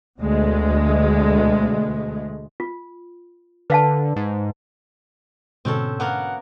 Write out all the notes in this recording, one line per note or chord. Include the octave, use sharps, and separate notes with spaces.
D2 B2 G#3 A3
F4
D3 B4 F5 A5
G#2
G#2 B2 D3 C4 C#4 A4
A#3 B3 A#4 F#5